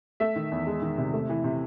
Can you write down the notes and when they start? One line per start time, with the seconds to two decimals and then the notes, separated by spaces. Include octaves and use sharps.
0.20 A3 E5
0.36 D#3
0.52 E2
0.67 G#3
0.82 D#3
0.98 C3
1.13 A3
1.29 E3
1.44 C3